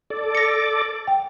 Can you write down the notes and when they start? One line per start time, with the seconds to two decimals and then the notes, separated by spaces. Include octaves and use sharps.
0.10 A4 D5 D6
0.35 A#6 C#7
1.08 G5